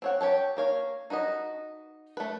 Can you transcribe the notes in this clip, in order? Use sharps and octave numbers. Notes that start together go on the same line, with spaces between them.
C4 C#5 F#5
G4 C#5 G5 A5
A#3 C#5 F5
D#4 F#4 B4 D#5
A3 B4